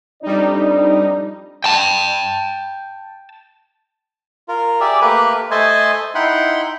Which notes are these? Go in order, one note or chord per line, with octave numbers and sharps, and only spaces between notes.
F2 G3 D4 D#4 D5
G5 A5
F4 A#4
G4 G#4 D5 E5
A3 A#3 G4 A#4 B4 B5
A3 C5 D#5 E5 G#5 A5
D#4 E4 F#5 G5 B5 C6